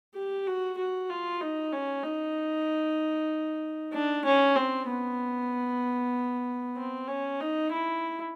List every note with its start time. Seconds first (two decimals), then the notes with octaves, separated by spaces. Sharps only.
0.15 G4
0.47 F#4
0.78 F#4
1.10 F4
1.41 D#4
1.73 C#4
2.04 D#4
3.93 D4
4.25 C#4
4.56 C4
4.87 B3
6.77 C4
7.08 C#4
7.40 D#4
7.72 E4